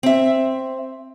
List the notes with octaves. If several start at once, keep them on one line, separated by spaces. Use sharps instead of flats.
C4 E5